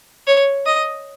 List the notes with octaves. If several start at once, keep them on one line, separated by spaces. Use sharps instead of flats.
C#5
D#5